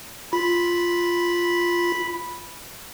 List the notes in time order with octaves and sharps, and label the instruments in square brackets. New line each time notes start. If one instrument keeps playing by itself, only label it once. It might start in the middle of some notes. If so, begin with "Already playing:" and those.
[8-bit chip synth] F4 [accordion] B5